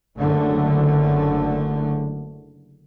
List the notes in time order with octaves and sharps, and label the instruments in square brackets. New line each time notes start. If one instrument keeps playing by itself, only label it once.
[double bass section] F#1 D3 A3